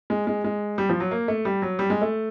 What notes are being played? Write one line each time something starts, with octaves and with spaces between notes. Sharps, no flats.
G#3
G#3
G#3
G3
F3
F#3
A#3
A3
G3
F#3
G3
G#3
A3